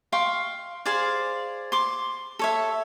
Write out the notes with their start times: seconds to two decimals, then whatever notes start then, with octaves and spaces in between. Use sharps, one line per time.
0.12 F5 G5 C6 C#6
0.85 G#4 C5 D5 F5
1.72 C6 D6
2.39 A4 C#5 E5